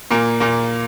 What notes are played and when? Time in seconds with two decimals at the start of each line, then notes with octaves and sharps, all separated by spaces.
0.11 A#2 A#3
0.40 A#2 A#3